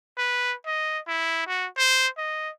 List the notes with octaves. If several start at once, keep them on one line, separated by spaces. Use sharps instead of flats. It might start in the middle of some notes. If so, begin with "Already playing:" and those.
B4
D#5
E4
F#4
C5
D#5